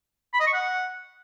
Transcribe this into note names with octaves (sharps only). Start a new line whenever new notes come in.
B5
D#5
C#6
F#5